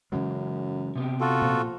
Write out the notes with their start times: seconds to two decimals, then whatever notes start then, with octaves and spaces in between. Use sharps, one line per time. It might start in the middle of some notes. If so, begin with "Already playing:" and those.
0.12 F#2 C#3 E3 G#3
0.96 C3 B3 G4
1.21 F4 F#4 A4
1.42 A#2 F3